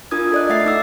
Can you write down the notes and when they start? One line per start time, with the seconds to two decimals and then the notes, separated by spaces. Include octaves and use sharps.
0.11 D4 F4 A#4 D#6 G#6
0.32 A4 A#4 D5 D#5 F#6
0.49 A3 E5 F#5 A6 C7
0.65 D#4 D6 E6